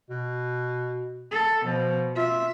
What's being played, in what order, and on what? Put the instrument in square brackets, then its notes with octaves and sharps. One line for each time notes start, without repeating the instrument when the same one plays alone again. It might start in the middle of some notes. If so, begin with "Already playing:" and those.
[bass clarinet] B2
[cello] A4
[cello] B2 [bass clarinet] F3
[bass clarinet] F4 [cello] E5